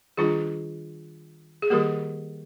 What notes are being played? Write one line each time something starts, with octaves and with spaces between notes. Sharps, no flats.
D#3 G3 D4 F4 G#4
G#4
D#3 G3 A#3 G4 A#4